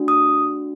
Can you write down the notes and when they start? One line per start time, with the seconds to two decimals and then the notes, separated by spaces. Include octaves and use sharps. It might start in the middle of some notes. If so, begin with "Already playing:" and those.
Already playing: A3 D4 F#4
0.08 D#6